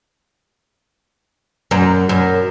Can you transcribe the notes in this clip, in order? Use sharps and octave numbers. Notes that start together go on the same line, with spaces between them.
F#2
F#2